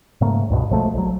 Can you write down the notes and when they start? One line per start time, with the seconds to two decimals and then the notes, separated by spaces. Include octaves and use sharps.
0.21 G#2 C#3 A3 A#3
0.50 C#2 G2 B2
0.70 B1 F3 G#3 A3
0.94 A#1 F#3